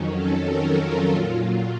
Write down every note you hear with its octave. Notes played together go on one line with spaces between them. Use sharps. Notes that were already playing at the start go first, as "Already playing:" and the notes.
Already playing: F2 D#3 F#3 C#4
A4
A#4
F4
A#2 F#3